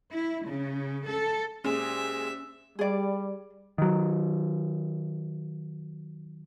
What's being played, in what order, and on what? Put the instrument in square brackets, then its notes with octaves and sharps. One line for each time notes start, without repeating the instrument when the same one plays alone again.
[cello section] E4
C#3
A4
[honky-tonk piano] A#2 G#3 [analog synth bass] C#4 [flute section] G4 G#4 C5 [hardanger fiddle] E5
[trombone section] G3 [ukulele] G#4 D5
[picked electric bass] D#3 F#3